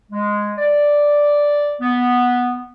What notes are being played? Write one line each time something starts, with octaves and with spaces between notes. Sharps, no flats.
G#3
D5
B3